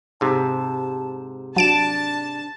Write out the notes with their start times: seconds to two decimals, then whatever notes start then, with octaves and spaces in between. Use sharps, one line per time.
0.21 G#2 C3 A5
1.56 F#3 D4 A5 D7 E7